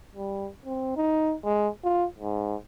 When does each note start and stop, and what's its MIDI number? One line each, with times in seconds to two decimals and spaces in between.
0.15 0.49 55
0.65 0.92 60
0.96 1.34 63
1.44 1.68 56
1.84 2.06 65
2.18 2.55 44